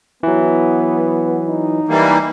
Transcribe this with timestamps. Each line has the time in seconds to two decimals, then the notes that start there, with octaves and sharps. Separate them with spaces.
0.23 E3 F#3 B3
1.47 D#4
1.89 E3 G3 A#3